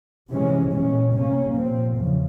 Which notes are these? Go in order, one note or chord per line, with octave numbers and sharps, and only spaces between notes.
C3 E3 G#3 C#4
A#2 G#3 C#4
C3 G3 A#3 C#4
A#2 F3 C4
E2 C#3 F3